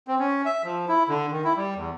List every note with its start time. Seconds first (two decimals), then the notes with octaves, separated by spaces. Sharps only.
0.08 C4
0.19 C#4
0.46 E5
0.64 F3
0.89 E4
1.09 D3
1.31 D#3
1.44 E4
1.57 G3
1.76 E2